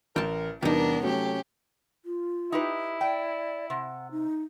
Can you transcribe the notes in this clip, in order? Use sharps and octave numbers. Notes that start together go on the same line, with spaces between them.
A1 A#4 G5 A5
E2 C3 G3 B3 D4 D#4 A#4
F#3 A3 C#4 G4
F4
D#4 E4 G4 B4
D5 G5
C3 F#5
D#4